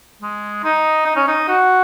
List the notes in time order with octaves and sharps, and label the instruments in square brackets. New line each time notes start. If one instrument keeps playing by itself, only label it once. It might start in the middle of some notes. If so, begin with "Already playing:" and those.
[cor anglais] G#3
D#4
D#4
C#4
D#4
F#4